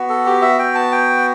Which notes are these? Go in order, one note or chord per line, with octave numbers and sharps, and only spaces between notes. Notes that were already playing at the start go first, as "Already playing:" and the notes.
Already playing: B3 F#4
A4
G4
E5
G5
A5
G5